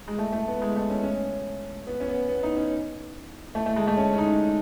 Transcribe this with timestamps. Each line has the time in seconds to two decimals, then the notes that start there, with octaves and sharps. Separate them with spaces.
0.08 G#3
0.19 A3
0.32 A3
0.48 B3
0.62 G#3
0.76 A3
0.90 C#4
1.03 C#4
1.87 B3
2.00 C#4
2.09 B3
2.29 B3
2.43 D#4
2.57 C#4
3.55 A3
3.66 A3
3.76 G#3
3.87 A3
3.97 C#4
4.13 C#4
4.18 D#4